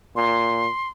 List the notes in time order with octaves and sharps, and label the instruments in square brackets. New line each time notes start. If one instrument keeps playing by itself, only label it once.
[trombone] A#2 [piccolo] C6